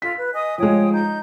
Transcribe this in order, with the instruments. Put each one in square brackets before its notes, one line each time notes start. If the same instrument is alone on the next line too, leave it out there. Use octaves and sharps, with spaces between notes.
[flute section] F4 A4 [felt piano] B6
[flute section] B4
D#5 G#5 D#6
[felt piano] F3 G#3 [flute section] C#5 G5 D#6
[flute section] D#4 G6